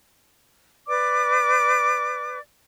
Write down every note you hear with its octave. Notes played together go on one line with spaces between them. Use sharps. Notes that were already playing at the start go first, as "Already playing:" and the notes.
B4 D5 D6